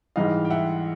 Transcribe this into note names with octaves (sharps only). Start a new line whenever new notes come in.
G#2 E3 G3 D#5 F5
G5
E5 F#5